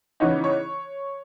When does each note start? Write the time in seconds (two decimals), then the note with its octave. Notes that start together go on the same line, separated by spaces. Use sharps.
0.20 C#3 E3 B3 D#4 C#5
0.44 C#5